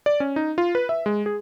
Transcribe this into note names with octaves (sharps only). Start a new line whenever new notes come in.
D5
C#4
D#4
F4
B4
E5
G#3
G#4